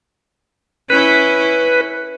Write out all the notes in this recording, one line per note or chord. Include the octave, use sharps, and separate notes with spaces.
C#4 E4 B4